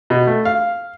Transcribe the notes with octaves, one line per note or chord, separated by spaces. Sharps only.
B2
A3
F5